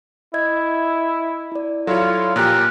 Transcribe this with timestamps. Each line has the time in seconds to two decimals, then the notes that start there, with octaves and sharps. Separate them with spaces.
0.34 E4 D#5 E5 G#6
1.52 E4 D5
1.87 F#3 E4 F4 A4 C#5
2.36 A#2 F3 G4 A#5 F6 F#6